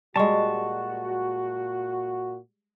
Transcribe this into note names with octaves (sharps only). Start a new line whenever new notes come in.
A#2 G3 G#3 F#4 A5 C#6